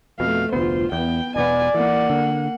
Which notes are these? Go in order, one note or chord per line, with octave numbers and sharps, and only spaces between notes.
F2 B2 A3 F5
F1 D2 B3 F4 C5
E2 B3 G5
E1 B2 B3 D5 G#5
E3 A#3 F#5
D3